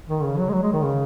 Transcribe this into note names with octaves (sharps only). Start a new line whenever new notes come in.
D#3
C#3
F#3
G#3
F#3
G#3
D#3
C#3